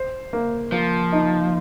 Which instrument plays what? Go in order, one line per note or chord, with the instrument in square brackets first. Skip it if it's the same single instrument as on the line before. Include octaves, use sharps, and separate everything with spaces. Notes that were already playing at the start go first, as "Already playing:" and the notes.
Already playing: [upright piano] C5
A#3
[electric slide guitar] F3 [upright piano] A#3
[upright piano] D#4